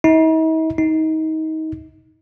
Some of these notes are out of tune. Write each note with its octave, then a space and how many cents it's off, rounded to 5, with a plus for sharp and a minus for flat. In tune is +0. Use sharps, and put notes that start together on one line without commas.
D#4 +45
D#4 +25